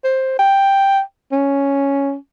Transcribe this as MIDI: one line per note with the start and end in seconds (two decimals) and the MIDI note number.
0.04 0.39 72
0.39 1.01 79
1.32 2.15 61